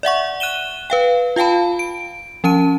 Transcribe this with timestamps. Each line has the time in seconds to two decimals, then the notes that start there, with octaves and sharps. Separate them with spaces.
0.03 D5 E5 F#5 C#6
0.40 F#6 D#7 E7 G7
0.90 B4 F5 G5
1.36 F4 F5 G5 A5 B5
1.79 D7
2.44 F3 C#4 A5 D#7